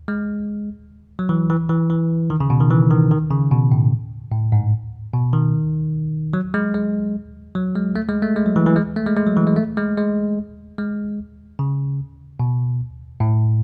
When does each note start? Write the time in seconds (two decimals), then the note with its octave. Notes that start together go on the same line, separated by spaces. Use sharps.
0.08 G#3
1.19 F#3
1.29 E3
1.50 E3
1.69 E3
1.90 E3
2.30 D#3
2.40 C#3
2.50 B2
2.60 D#3
2.71 E3
2.91 D#3
3.11 D#3
3.31 C#3
3.51 B2
3.72 A2
4.32 A2
4.52 G#2
5.13 B2
5.33 D#3
6.33 F#3
6.54 G#3
6.74 G#3
7.55 F#3
7.75 G#3
7.96 A3
8.08 G#3
8.22 A3
8.36 G#3
8.46 F#3
8.56 E3
8.66 E3
8.76 G#3
8.96 A3
9.06 G#3
9.17 G#3
9.27 F#3
9.37 E3
9.47 G#3
9.56 A3
9.77 G#3
9.98 G#3
10.78 G#3
11.59 C#3
12.40 B2
13.20 A2